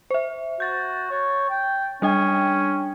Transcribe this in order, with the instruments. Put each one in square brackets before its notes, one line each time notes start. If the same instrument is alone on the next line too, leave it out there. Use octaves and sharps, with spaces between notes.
[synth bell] C5 E5
[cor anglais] F#4 [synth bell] G6 A6
[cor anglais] C#5
G5
[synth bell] G3 D4 G5 [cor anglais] C#4